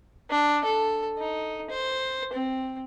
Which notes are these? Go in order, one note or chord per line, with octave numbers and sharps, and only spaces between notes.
D4
A4
D#4
C5
C4